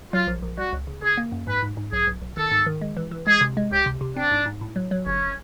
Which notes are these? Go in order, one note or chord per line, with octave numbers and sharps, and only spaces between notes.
F#3 F4
A#1
A#1
G3 F#4
C#2
C#3
C#3 G#4
A#3
F#2
G#2 B4
G#2
G#2
B1 G#4
B1
B1
D#3 A4
G#2
D#3
G#3
E3
E3
G#3 G#4
C3
G#3
C#2 G4
C3
C3
C4 D4
G#2
G#2
A2
F#3
F#3
G1 C#4